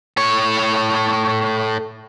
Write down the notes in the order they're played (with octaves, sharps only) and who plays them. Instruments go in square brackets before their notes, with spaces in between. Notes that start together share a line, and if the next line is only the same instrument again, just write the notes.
[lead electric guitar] A2 C#5